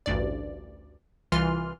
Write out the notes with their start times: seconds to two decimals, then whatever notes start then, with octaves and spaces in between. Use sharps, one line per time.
0.06 A1 D2 G2 D5
1.32 C2 E3 F4 C6 F6